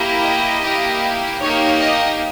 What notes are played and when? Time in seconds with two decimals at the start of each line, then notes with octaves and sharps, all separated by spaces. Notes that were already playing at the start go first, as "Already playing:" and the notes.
Already playing: A#3 E4 G4
0.24 D#5
0.62 A#3 E4 G4
1.41 A#3 D#4 G4 C#5
1.81 D#5